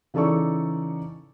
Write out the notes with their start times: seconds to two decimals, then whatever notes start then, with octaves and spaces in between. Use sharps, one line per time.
0.14 C#3 E3 D#4 A4 D5 C#6